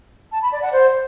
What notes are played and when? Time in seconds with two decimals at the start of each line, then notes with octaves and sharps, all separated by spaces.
0.32 A5
0.42 B5
0.52 D5
0.62 F#5
0.72 C5